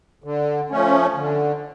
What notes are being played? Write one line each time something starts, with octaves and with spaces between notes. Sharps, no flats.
D3
F3 A3 C#4
D3